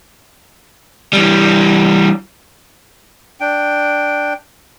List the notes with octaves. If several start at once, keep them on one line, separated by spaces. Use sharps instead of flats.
E3 G3
D4 G5